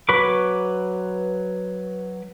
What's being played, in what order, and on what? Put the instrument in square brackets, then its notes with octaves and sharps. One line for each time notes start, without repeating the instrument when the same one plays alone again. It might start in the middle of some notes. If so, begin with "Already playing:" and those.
[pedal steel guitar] F#3 B4 B5 C#6 D6